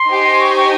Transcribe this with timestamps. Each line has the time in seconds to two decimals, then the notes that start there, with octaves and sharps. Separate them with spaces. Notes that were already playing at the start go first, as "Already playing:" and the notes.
Already playing: C6
0.09 D#4 G4 C5 D#5 G#5
0.40 C#6
0.56 C#6